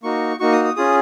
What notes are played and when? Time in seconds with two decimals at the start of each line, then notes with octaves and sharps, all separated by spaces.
0.03 A#3 D#4 F#4 C#6
0.40 A#3 D#4 F#4 C#6
0.52 D#6
0.65 D#6
0.76 C#4 F4 G#4 D#6